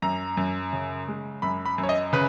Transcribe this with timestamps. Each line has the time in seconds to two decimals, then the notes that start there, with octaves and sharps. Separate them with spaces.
0.02 F#2 A#5
0.37 F#2
0.73 C#3
1.08 G#3
1.42 F#2 B5
1.66 B5
1.78 F#2
1.83 C#5
1.89 D#5
2.13 C#3 B4